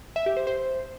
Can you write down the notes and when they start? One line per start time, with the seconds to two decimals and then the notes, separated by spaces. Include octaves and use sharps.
0.16 E5
0.26 G4
0.37 C5
0.47 C5